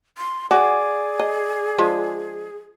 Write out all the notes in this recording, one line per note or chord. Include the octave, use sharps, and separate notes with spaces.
C6
F#4 G#4 D5 G#5 D6
D#5
F3 G#3 D4